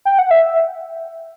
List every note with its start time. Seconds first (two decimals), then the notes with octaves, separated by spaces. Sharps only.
0.05 G5
0.19 F#5
0.31 E5